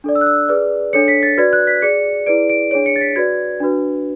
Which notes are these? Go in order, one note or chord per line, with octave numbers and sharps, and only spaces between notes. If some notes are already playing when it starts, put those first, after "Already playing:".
D4 A4 D5
E6
F#6
E6
G#4 B4 D5
D4 A4 C#5 C#7
B6
A6
F#4 B4 D5 G#6
F#6
B6
G#4 D5 C#7
E4 G#4 B4 D5 D7
D7
D4 G#4 C#5 D7
C#7
A6
B6
F#4 B4 D5 G#6
D4 F#4 B4